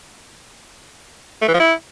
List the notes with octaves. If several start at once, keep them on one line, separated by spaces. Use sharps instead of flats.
A3
E3
F3
E4